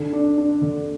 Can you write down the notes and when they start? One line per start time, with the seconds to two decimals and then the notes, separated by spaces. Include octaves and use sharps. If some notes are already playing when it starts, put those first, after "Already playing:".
Already playing: D3
0.13 D4
0.38 D4
0.62 D3